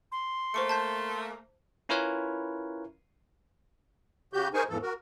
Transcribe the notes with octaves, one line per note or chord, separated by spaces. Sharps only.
C6
A3 A#3 C5 C#6 C#7
A5 G6 B6
C#4 E4 F4 A#4 B4 C#5
C#3 F#4 G4 G6
D#4 G#4 A#4 C5 G#5 C#6
E2 G#2 E3 F3 A4
F#4 A#4